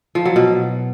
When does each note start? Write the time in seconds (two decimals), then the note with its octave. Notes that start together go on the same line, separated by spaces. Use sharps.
0.15 F3
0.25 F#3
0.36 B2